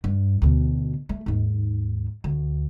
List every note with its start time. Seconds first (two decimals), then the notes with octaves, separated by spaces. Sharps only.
0.04 G2
0.42 D2 B2
1.09 A3
1.26 D#2 G#2
2.24 D2